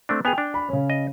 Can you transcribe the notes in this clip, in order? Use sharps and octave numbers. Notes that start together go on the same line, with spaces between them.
A3 C4 D4
B3 G#4 G5 G#5 F7
D4
B5
C#3 C#4
D#5